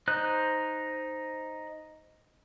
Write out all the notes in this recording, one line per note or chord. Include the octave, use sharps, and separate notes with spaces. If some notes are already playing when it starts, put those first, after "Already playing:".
D#4 C5 F#6